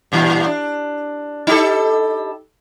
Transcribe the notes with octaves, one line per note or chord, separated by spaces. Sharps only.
G2 A#2 E3
D4
D#4 G4 A4